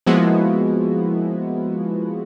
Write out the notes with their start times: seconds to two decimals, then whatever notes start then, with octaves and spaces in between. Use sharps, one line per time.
0.06 F3 G#3 A#3 B3 E4 F#4